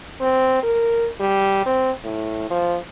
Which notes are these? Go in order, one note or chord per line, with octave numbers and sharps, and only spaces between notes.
C4
A#4
G3
C4
A2
F3